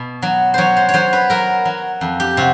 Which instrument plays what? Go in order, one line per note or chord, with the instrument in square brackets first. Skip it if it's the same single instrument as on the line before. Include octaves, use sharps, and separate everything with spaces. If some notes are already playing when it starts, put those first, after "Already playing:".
Already playing: [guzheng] B2
F#3
F#3 C5 C#5
C5
C#5
F#3 C5
B4
F#3 A#4
F#3
F2
G4
C3 F#4